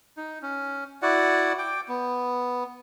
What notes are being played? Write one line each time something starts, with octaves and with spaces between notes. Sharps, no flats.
D#4
C#4
E4 F#4 D5 F#5
G5 D6
B3